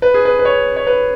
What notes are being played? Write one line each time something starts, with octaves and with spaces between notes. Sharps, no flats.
B4
G#4
B4
B4
C#5
C#5
B4